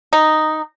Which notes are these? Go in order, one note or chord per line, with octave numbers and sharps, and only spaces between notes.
D#4